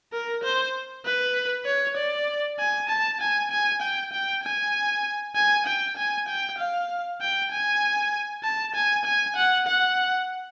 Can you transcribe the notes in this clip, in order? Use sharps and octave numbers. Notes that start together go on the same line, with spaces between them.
A#4
C5
B4
C#5
D5
G#5
A5
G#5
G#5
G5
G5
G#5
G#5
G5
G#5
G5
F5
G5
G#5
A5
G#5
G#5
F#5
F#5